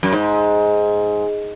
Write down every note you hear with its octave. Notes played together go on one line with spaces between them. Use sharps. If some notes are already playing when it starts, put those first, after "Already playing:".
F#2
G#2